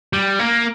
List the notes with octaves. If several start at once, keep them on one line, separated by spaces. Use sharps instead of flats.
G3
A#3